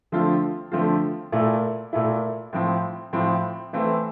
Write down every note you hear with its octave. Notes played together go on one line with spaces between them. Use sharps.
D3 F3 A3 C4 F4
D3 F3 A3 C4 F4
A#2 A3 E4
A#2 A3 E4
A2 F3 C4
A2 F3 C4
E3 A3 C4 E4